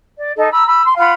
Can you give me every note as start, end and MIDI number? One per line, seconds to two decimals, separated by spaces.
0.18 0.30 74
0.36 0.50 63
0.36 0.50 69
0.36 0.50 75
0.52 0.64 82
0.52 0.64 83
0.52 0.64 88
0.66 0.83 83
0.66 0.83 88
0.84 0.97 84
0.97 1.12 65
0.97 1.12 77
0.97 1.12 78
0.97 1.12 83